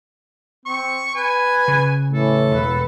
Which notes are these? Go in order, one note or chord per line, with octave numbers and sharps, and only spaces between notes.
C4 C#6
B4 G#5
C#3
A2 E3 A4
E1 B4